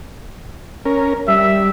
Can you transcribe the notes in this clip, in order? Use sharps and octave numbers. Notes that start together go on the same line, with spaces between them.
C#4 A#4
G3 E5